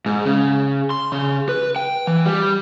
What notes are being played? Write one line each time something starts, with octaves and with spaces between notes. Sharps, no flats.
G#2
C#3
C6
C#3
B4
G5
E3
G3